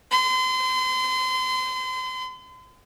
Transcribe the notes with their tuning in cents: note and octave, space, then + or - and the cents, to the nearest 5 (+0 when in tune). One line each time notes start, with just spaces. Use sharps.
C6 -35